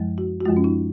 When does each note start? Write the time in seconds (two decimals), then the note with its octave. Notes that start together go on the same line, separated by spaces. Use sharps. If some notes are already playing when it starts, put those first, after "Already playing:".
Already playing: F#2 F3 G#3
0.18 F#4
0.40 F#4
0.45 F#2 F3 G#3 F4
0.57 C#4
0.64 D#4